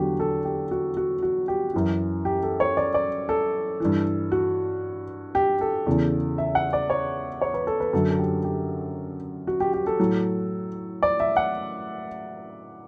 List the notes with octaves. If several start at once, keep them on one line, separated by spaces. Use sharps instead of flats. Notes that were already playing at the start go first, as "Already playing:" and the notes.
Already playing: E2 D3 F#3 F#4 G4
A4
G4
F#4
F#4
F#4
G4
F#2 E3
G4
A4
C#5
D5
D5
A4
G2 E3
F#4
G4
A4
E2 C#3 E3
E5
F#5
D5
C#5
C#5
B4
A4
B4
F#2 D3 F#3 A4
A4
G4
G4
F#4
G4
G4
A4
A2 F#3
D5
E5
F#5